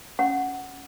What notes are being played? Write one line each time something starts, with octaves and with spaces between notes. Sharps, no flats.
C#4 F#5